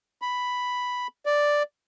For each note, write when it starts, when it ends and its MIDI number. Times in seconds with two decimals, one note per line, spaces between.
0.22 1.07 83
1.26 1.63 74